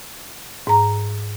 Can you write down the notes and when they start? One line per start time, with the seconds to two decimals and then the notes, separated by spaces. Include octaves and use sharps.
0.67 G#2 A#5